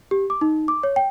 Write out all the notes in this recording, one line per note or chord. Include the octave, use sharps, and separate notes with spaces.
G4
D6
D#4
D6
C#5
G5